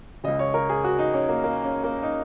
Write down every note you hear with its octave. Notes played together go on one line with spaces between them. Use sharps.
C#2 C#3 D#5
C#5
A#4
G#4
F#4
D#4
C#4
A#3
A#3
C#4
A#3
D#4